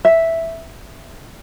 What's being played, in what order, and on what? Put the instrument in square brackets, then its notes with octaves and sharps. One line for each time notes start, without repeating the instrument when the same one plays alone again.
[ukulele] E5